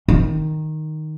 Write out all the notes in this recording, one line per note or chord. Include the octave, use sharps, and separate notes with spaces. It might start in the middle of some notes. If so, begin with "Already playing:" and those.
D#3